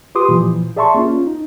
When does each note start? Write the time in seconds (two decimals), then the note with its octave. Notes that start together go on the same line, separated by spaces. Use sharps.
0.15 F4 G4 B4 C6 D6 D#6
0.29 A#2 E3 F3
0.76 G#4 D5 E5 A5 C6 C#6
0.95 A#3 C#4 F4
1.27 D#4